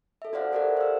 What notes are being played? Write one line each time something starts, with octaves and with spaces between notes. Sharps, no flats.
A4 E5
F#4 C5 D5 F5 F#5
G4 A4 A#4 D5 E5 F#5
C5 E6